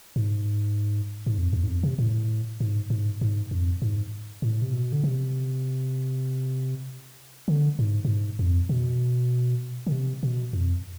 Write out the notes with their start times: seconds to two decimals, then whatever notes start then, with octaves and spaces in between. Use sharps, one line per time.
0.16 G#2
1.26 G#2
1.38 F2
1.53 E2
1.64 G#2
1.68 F2
1.83 C3
1.99 A2
2.60 G#2
2.90 G#2
3.21 G#2
3.51 F2
3.82 G#2
4.42 A2
4.62 C3
4.73 B2
4.92 D3
5.04 C3
7.48 D3
7.79 G#2
8.05 A2
8.09 G#2
8.39 F2
8.69 B2
9.87 D3
9.92 C3
10.23 B2
10.53 F2